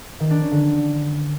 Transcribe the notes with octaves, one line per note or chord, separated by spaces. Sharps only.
D#3
D4
C#4
D3